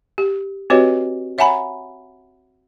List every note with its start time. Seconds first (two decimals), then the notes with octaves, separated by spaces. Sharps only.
0.18 G4
0.70 C4 F#4 G4 B4 C#5 D#5
1.38 C#5 E5 F#5 G#5 A#5 B5